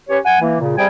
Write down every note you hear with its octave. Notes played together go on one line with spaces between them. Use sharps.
C#4 G4 B4 C#5
F#5 G#5
E3 A#3
A#2 C#3
C3 G3 G#4 G5 G#5